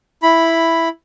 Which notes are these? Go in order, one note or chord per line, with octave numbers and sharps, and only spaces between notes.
E4 B5